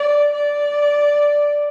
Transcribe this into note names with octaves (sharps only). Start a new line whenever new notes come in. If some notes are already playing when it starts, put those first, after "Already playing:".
Already playing: D5
D5